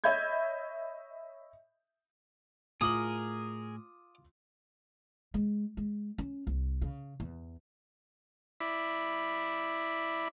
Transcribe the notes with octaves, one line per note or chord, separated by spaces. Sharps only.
C#5 D#5 E5 B5 G6 G#6
A2 F4 G#4 A#4 D6 D#6 F#7
G#3
G#3
C#4
C2
C#3
E2
E4 D5 B5